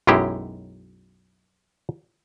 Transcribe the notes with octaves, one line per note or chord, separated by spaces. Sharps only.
B1 F#2 G#3 E4 G4